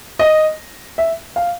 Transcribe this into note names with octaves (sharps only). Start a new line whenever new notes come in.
D#5
E5
F5